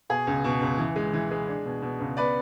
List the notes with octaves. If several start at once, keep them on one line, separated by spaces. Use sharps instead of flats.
B2 G#4
C#2
B2
C#2
E3
G#3
E3
G#3
D4
B2
B2
C#2
B3 B4 D5